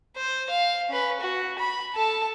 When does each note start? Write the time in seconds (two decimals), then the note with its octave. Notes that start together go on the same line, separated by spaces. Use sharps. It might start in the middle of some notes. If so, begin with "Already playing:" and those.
0.16 C5
0.50 F5
0.89 C#4 B4
1.21 F#4
1.59 B5
1.95 A4 A5